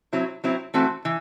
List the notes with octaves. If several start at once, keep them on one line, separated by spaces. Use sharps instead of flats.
F#3 C4 E4
F#3 C4 E4
E3 A3 C4 F#4
E3